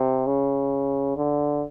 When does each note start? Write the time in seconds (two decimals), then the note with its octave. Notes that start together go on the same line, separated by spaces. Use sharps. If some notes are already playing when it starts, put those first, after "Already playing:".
Already playing: C3
0.27 C#3
1.17 D3